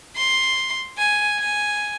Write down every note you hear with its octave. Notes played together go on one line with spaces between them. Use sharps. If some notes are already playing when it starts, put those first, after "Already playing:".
C6
G#5
G#5